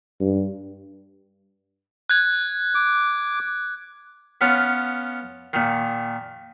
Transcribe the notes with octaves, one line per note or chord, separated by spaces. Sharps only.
G2
F#6 G#6
D6
B3 C#4 F4
A#2 D#3